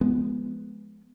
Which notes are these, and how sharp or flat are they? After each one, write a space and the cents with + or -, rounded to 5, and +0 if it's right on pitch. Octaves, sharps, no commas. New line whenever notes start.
F3 +0 G#3 +15 B3 +0